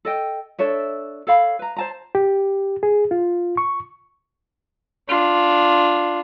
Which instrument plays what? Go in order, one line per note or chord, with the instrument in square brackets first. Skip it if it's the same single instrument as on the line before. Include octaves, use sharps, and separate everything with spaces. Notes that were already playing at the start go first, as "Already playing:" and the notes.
[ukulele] A4 D#5 G5
D4 A4 C#5 E5
A4 C#5 F5 B5
B4 A#5
C5 A5 A#5
[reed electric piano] G4
G#4
F4
C#6
[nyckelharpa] D4 F4